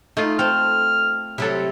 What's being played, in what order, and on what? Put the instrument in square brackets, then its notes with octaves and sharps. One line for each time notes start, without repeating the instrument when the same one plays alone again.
[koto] A3 F4 [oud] D#4
[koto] C4 [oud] A4 [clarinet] F6
[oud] C3 F#3 [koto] E4 A4